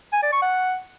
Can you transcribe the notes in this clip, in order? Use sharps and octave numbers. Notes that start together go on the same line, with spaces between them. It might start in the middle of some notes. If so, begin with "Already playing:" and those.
G#5
D5
C#6
F#5